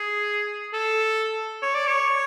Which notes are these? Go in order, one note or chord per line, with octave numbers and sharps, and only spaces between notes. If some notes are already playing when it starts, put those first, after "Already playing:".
Already playing: G#4
A4
C#5
D5
C#5